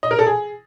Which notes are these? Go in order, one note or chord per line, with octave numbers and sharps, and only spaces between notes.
D#5
A#4
A4
G#4